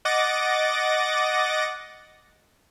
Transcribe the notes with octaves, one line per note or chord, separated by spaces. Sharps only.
D#5 F#5 D6 A6 A#6